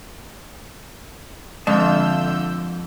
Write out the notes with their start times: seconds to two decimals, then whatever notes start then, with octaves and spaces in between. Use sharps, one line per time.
1.67 F2 D3 G#3 E5 F5 A5 E6 G6